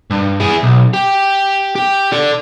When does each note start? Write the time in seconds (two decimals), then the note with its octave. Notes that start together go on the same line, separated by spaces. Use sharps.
0.10 G2
0.40 E4 G#4
0.63 B1
0.94 G4
1.75 G4
2.12 A4 D5